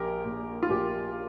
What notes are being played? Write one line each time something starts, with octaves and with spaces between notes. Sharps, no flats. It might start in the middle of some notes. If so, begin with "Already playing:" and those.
Already playing: A#1 G4 A#4
A#2
F4
A#1 G4